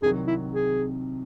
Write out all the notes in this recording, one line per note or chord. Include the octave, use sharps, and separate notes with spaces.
C2 C3 D#3 F#3 G#4
E4
G#4